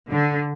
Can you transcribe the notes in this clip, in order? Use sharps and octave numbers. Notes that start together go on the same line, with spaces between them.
D3